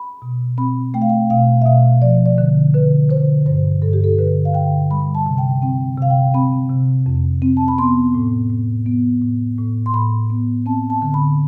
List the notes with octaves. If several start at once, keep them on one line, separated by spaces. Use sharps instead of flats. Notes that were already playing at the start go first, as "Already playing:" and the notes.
Already playing: B5
B2
C4 B5
A3 G5
F5
G5
B2 F5
E5
B2 F5
F3 D5
D5
D3
D3 B4
D3 C5
G2 C5
G2 A4
G4
A4
D3 B4
F5
D3 G5
G3 B5
A5
C3
G5
C4 G5
C3 F5
G5
C4 B5
C3
F2
C4
A5
B5
B3 C6
A2
A2
B3
A2
A2
C6
A2 B5
B3
C4 A5
A5
D3
B5